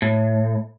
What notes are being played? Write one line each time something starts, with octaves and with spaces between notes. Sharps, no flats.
A2